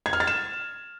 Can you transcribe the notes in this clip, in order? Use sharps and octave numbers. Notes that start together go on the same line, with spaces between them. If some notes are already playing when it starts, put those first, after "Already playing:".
G#6
F6
A6
E7